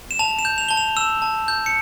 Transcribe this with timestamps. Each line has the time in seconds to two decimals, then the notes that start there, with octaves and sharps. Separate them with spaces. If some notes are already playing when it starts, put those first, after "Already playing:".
0.11 E7
0.19 A5 F7
0.39 E7
0.45 G6
0.58 F7
0.68 A5 G7
0.77 F7
0.97 E6 E7
1.22 A5
1.48 G6
1.66 C#7